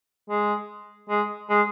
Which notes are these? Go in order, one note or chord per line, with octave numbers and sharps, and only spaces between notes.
G#3
G#3
G#3